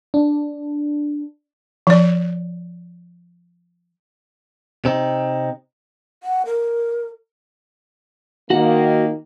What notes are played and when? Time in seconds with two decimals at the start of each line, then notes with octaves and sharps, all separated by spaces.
0.14 D4
1.87 F3 D5
4.85 C3 C4 D#4
6.22 F#5
6.46 A#4
8.50 D#3 A#3 F#4 F#5